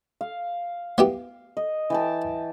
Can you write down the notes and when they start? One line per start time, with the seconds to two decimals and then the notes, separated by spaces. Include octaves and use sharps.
0.21 F5
0.98 B3 E4 G4
1.57 D#5
1.90 E3 G5 A5